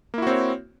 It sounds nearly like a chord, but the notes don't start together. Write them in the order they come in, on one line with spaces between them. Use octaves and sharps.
A#3 E4 F#4 C4 C#5